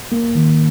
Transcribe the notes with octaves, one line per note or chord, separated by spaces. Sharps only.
A#3
D#3